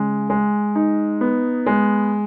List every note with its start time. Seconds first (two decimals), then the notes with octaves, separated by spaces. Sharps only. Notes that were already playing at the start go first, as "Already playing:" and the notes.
Already playing: C#3 G#3
0.30 G#3
0.75 D#4
1.21 B3
1.66 G#3